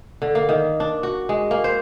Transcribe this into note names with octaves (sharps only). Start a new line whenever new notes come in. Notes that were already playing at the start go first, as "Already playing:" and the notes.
D3
A#3
D#3
D4
F#4
G#3
A#3
C5